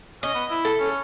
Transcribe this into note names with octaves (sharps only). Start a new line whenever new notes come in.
C#4 D#5
B3
E4
A4
C#4